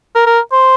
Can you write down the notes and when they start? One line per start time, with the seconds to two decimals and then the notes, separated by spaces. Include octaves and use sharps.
0.15 A#4
0.26 A#4
0.52 C5